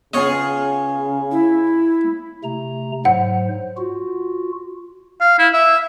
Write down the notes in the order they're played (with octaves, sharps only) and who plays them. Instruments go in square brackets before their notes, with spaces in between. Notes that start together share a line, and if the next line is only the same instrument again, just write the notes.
[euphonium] C#3 [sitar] B3 F4 G#4 [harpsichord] C#5 D#5
[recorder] E4
[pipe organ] C3 A3 A#5
[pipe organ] G#2 F#3 C5 [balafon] F#5
[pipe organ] F4 F#4
[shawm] F5
E4
E5